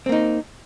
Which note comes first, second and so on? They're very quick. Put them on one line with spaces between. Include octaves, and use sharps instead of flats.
C4 A#3 D#4